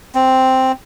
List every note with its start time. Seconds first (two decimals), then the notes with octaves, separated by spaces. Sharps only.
0.15 C4